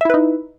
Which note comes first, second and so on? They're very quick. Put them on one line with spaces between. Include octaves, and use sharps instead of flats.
E5 E4 B4 D#4